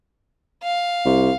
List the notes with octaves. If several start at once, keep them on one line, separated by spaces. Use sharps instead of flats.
F5
C2